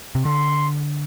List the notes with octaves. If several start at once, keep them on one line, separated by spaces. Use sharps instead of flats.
C3
D3 C6